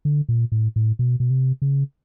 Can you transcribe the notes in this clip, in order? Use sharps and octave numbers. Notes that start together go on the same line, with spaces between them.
D3
A#2
A2
A2
B2
B2
C3
C#3